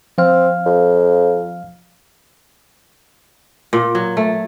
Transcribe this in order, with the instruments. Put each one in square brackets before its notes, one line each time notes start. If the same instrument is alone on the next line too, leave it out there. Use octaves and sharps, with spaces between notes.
[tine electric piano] F3 F5 F6 [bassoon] C4
[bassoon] F2
[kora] A#2
F#3
A3